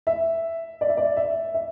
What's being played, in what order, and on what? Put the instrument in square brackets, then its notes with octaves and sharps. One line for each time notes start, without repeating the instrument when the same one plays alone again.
[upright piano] E5
D5
E5
D5
E5
E5